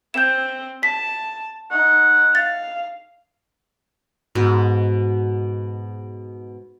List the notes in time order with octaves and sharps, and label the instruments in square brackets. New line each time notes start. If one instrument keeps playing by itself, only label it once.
[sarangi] C4 [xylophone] G6 E7
[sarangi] A5 [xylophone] B6
[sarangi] D#4 [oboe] F#5
[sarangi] F5 [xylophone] A6
[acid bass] G#2 [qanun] B2